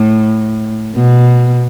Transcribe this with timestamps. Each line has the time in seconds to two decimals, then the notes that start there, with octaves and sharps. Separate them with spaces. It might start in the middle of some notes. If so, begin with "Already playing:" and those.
Already playing: A2
0.95 B2